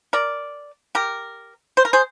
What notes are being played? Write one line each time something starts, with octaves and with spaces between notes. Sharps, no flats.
A#4 D5
G4 A#4
C5
A#4
G#4 C5